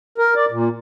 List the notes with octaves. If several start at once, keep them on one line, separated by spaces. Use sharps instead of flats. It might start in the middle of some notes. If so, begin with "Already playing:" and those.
A#4
D5
A#2